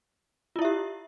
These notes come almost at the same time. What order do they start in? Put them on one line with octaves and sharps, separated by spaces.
F4 E4 E5 G4